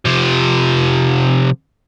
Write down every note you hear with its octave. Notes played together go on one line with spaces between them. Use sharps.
C3 F3